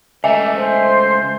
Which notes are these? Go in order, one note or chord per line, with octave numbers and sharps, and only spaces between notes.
C#2 A3 D#5 E5 G#5
C5